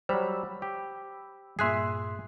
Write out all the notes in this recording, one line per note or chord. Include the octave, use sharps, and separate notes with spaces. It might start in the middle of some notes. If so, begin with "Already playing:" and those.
F#3 G3 C5 B5 E6
G4
G2 A#2 G#4 E5 C6 F#6 C7